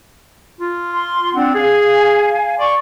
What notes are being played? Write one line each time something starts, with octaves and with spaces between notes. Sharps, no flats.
F4
C6
C4 D4 F#5
G#4 F5 G#5
D5 C6 C#6